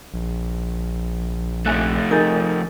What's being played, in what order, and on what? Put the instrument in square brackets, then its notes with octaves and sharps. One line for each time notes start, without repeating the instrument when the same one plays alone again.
[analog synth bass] A#1
[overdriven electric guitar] F2 A3 [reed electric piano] E5 G#5 F#6
[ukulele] D#4 G#4 [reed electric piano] A#4 G6 A6